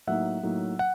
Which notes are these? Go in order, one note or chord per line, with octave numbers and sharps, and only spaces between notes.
A2 F#3 A#3 D#4 E5 F#5
A2 F#3 A#3 D#4
F#5